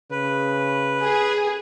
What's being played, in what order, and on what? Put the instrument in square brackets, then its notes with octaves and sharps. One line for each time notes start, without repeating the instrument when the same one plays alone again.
[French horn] C#3 [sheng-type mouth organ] B4
[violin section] G#4